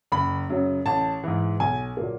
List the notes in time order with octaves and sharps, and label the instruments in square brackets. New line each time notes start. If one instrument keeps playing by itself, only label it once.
[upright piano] F#1 B5
F#2 C#3 F#3
A1 A5
G#2 E3
B1 G#5
A#2 F#3 A#3